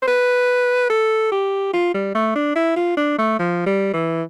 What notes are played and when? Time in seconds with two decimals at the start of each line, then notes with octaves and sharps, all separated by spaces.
0.02 C5
0.08 B4
0.90 A4
1.32 G4
1.74 F4
1.94 G3
2.15 A3
2.36 D4
2.56 E4
2.76 F4
2.97 D4
3.18 A3
3.39 F3
3.66 G3
3.94 E3